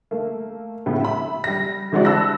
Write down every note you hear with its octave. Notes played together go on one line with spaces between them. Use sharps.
A3 A#3
A2 C#3 B3
E5 B5
G3 A#6
D3 E3 G#3 C4 F#4 D5
A5 B5 E6 F#6 A#6